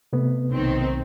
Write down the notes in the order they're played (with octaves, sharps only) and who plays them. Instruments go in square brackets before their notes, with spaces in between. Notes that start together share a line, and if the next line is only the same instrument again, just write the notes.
[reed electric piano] C3 A3 B3
[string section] B1 D#3 C4